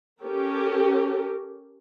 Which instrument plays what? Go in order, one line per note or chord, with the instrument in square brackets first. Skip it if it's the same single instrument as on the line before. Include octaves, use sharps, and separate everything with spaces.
[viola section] C#4 G4 A4 A#4